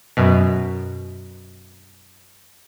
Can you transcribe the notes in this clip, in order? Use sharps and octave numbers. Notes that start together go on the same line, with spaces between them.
F#2 B2